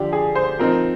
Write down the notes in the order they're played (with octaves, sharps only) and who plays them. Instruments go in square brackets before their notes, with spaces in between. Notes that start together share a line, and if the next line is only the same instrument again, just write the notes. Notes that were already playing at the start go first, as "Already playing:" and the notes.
Already playing: [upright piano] D3 F3 D4 G4
G#4
C5
F3 C4 D#4 A#4